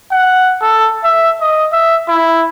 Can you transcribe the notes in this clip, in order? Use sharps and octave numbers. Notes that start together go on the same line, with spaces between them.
F#5
A4
E5
D#5
E5
E4